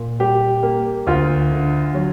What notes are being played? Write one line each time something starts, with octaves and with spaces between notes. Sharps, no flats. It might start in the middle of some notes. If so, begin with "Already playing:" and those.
Already playing: A#2
G3 G4
A#3
D2 F4
D3
F#3